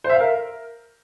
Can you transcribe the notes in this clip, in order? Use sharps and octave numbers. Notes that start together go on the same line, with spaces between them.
C5
E5
F5
A#4